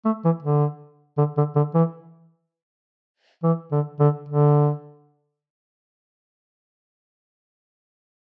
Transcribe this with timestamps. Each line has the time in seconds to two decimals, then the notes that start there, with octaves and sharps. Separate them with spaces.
0.05 A3
0.24 E3
0.43 D3
1.18 D3
1.37 D3
1.56 D3
1.74 E3
3.43 E3
3.71 D3
4.00 D3
4.28 D3